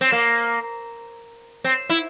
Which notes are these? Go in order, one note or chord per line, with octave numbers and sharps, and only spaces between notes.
C4
A#3
C4
E4